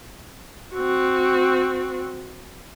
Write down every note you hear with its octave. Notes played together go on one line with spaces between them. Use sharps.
C4 F#4